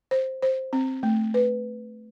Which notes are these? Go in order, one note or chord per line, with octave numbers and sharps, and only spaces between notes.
C5
C5
C4
A3
B4